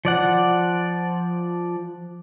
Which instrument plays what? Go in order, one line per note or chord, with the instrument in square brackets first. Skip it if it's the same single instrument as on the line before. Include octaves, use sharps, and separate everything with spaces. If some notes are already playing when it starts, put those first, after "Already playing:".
[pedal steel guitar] F3 D5 F#5